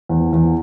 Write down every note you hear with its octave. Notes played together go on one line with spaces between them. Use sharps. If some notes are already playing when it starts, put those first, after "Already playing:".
E2
E2